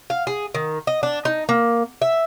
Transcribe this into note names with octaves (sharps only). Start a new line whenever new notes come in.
F5
G#4
D#3
D#5
D4
D#4
A#3
E5